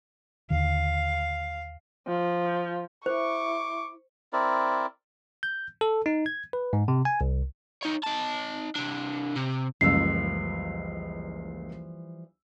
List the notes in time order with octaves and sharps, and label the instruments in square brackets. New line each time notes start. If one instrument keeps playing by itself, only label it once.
[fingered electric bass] D#2 D3 D#3 [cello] F5
[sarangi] F3
[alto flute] E4 [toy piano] C5 [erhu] C#6 [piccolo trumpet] D6
[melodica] C4 E4 A#4 D5
[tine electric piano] G6
A4
D#4
G#6
B4
G#2
C3
G#5
C2
[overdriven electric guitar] D#4 C#5
D#4 A5
C3 D4
C3
[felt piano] F#1 C#2 E6 [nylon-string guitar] E3 F3 G3 [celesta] C7